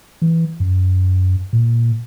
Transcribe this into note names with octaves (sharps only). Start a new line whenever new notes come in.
E3
F#2
A#2